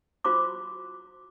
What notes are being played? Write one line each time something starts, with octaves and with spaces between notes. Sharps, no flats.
F4 F#4 C5 A#5 C6 D6